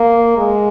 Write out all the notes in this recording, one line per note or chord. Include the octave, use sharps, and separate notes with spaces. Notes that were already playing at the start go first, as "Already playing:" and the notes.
Already playing: A#3
G#3